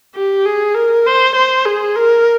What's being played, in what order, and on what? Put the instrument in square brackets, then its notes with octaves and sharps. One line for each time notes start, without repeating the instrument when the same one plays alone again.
[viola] G4
G#4
A#4
C5
C5
G#4
A#4